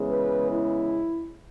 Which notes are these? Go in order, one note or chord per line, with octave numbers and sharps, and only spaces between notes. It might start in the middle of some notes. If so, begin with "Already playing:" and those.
Already playing: C#3 E3 G#3 B3
B4
E4